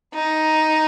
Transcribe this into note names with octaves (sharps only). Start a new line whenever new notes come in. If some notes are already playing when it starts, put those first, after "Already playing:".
D#4